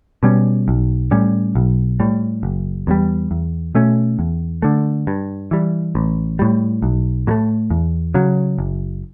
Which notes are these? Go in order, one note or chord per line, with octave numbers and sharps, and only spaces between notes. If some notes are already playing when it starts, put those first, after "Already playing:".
B2 G3 C#4
B1
A2 G3 C#4
B1
A2 G3
F#1
E2 C#3 G3
E2
B2 A3 C#4
E2
D3 A3
G2
E3 G3
A1
A2 G3
B1
A2 F#3 A3
E2
C#3 F#3
F#1